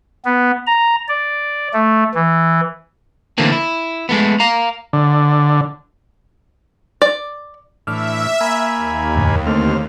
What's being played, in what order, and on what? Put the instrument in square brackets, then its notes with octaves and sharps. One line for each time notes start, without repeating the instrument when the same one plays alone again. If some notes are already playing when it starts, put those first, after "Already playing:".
[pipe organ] B3
A#5
D5
A3
E3
[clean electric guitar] D3 E3 A3 A#3 C4
E4
G#3 A3 B3
F5 A#5
[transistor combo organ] D3
[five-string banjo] D5
[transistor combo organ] A2 E3 D4 [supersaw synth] E5 [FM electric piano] E6 F6
[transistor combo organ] A#3 G#5 B5
[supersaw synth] D#2
[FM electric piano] F2 A2 D3
[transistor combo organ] D2 C4 F6 [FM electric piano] A3